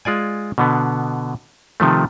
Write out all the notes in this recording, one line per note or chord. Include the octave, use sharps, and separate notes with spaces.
G#3 F4 D5 G#5
B2 D3 B3
C3 D#3 F3 A3